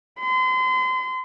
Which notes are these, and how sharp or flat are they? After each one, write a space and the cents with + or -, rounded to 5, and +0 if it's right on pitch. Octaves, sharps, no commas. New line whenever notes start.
C6 -35